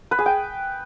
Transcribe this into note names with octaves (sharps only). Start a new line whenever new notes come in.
B4
G#4
G5